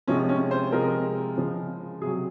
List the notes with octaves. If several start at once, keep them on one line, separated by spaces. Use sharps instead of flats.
C3 F3 G#3 C#4
C#4
C5
C3 F3 G#3 A#4
C#3 F3 G#3
C3 F#3 G#4